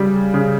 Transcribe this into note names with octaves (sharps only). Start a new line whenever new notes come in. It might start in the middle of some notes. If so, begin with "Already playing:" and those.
Already playing: C#3 G3
C#3